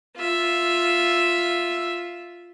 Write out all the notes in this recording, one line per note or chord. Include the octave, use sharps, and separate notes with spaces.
F4 E5